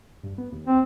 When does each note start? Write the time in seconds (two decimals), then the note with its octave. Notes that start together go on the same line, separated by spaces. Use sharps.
0.23 G2
0.38 B3
0.52 D#2
0.67 C4